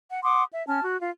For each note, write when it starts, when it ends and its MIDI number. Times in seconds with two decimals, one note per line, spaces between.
0.10 0.19 78
0.24 0.43 78
0.24 0.43 84
0.24 0.43 86
0.24 0.43 87
0.52 0.63 76
0.67 0.83 61
0.67 0.83 81
0.67 0.83 89
0.83 1.00 66
1.00 1.10 65